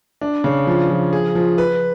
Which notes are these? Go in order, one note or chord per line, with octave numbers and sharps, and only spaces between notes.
D4
C#3
F3
F3
G#4
F3
B4